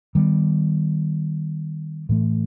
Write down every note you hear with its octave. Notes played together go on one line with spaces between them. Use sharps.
D#3 G3 B3
A2 E3 A3